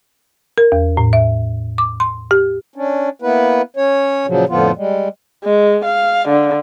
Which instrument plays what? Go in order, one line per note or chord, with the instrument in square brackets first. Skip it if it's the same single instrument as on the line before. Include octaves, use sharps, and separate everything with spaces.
[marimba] A#4
E2
A2
E5
D6
C6
G4
[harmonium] C#4 D4
A#3 B3 E4 B4
C#4 C#5
A#2 C#3 F3 F#3
F2 A2 D3 F3 B3 F4
G3 G#3
[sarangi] G#3
F5
D3